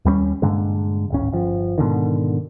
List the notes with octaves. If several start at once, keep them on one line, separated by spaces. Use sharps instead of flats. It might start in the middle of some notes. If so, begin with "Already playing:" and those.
D#2 G3 A3 C#4
G2 A#2 D3 G#3
D1 G#1 C#4
G1 F3
G#2 B2 D3 D#3